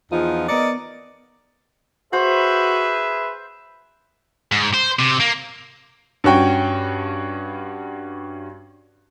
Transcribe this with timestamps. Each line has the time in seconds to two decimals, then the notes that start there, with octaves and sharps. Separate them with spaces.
0.12 E2 F3 D#4 F4
0.49 B3 A#4 D5 D#5 C#7
2.13 F#4 G#4 B4 C5 E5
4.52 G#2
4.74 C5
4.99 C3
5.20 A#3
6.24 G2 C#4 F#4 G5